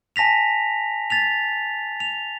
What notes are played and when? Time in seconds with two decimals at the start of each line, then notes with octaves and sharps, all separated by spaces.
0.16 G#5 A5 A#6 B6 F7
1.10 A6 B6 F7
2.00 F7